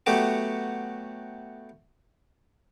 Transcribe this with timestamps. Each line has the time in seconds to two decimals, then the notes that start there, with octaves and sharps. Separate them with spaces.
0.06 F#3 A3 B3 F#4 G4